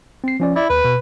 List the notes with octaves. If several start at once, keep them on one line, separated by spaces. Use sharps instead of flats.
C4 C7
F3 C#4 D5
E4 D5
D#2 B4
B2